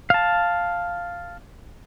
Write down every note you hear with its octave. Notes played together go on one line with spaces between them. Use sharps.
F5 A5